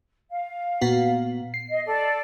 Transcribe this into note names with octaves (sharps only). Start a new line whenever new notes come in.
F5
A#2 B3 F#4
C7
D#5
A4 D5